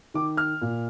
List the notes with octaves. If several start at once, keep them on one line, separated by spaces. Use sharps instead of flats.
D#3 D6
F6
A#2